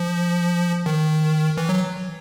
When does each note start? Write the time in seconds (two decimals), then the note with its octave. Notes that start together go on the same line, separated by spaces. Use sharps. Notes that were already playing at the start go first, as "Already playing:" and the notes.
Already playing: F3
0.86 D#3
1.57 E3
1.69 F#3